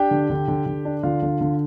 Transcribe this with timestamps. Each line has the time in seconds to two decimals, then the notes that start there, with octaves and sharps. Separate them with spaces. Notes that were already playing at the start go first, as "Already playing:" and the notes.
Already playing: D4 G4 G5
0.11 D3
0.30 D3
0.48 D3
0.66 D3
0.85 D4
1.03 D3 F4 F5
1.22 D3
1.41 D3